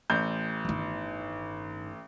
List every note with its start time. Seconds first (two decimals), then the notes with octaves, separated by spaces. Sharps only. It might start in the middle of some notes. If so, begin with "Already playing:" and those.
0.10 A1 G6
0.65 G1 D#3